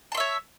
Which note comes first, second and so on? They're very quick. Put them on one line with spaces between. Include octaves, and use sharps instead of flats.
A5 C6 E5 C#5